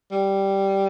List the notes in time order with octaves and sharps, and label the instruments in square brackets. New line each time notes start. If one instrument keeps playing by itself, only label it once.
[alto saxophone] G3